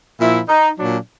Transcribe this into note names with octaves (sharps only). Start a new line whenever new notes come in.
A#2 F3 E4
D#4
A#2 F#3 D4